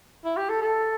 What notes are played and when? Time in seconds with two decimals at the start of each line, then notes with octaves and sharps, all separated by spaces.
0.25 E4
0.37 G4
0.49 A4
0.62 A4